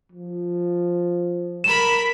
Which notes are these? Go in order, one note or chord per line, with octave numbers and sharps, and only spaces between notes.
F3
A#4 B5 E7